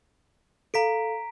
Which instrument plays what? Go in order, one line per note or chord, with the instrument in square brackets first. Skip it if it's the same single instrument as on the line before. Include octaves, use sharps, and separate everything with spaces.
[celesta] A4 F5 [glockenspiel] A#5 B6 D7